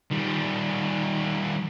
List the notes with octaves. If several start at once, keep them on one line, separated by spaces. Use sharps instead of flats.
D#3 G3